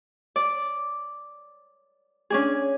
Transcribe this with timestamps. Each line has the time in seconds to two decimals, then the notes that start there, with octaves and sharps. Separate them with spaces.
0.36 D5
2.30 C#4 D4 G#4